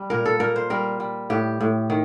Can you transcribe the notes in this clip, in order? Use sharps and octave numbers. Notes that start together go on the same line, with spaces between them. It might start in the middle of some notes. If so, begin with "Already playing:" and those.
Already playing: G3
A#2 A#4
A4
A#2 A#4
C5
G3 A#4
G3
A2 G4
A2
D#3